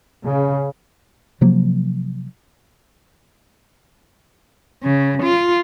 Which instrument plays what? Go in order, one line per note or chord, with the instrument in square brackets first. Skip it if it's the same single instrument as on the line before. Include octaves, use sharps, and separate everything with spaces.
[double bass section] C#3
[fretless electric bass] C3 F3 F#3 A#3
[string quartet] C#3
F4